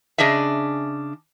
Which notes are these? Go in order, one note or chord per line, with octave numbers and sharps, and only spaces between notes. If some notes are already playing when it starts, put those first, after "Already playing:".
C#3 D4 G#4 D#5 E5